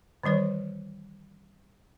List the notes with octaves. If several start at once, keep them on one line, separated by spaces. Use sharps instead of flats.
D#3 E3 G3 C5 C#5